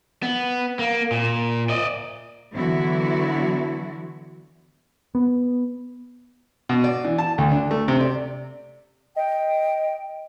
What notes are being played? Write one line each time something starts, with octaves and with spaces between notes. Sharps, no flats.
B3
A#3
A#2
D5 D#5
D3 E3 F#3 B3 E4 F#4
B3
B2
D5
E3
A5
D2
D4
A3
C3
D5
D#5 G5